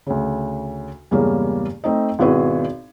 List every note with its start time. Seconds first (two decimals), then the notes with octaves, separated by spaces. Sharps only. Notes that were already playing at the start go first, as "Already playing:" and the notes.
0.07 D2 C#3
1.11 E2 G2 C#3 G#3 A#3 C#4
1.84 A3 C4 D#4 D#5
2.19 G#1 B2 E4 F#4 G#4 B4